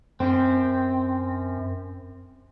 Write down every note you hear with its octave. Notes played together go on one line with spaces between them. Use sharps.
F#2 C4